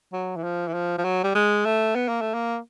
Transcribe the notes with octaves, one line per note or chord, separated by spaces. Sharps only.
F#3
E3
F3
E3
F3
F3
F#3
G3
G#3
A3
B3
A#3
A3
A#3